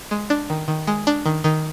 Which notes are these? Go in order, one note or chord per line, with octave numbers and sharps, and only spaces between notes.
G#3
D4
D#3
D#3
G#3
D4
D#3
D#3